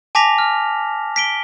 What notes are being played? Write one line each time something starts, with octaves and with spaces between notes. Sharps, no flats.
G#5 A5 D6 A#6 B6 F7
F6
B6 D7 G7